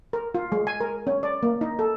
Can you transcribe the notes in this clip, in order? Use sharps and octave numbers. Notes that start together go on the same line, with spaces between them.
A#4
F4
G#3
G#5
A#4
C#4
D5
A#3
D#4
A4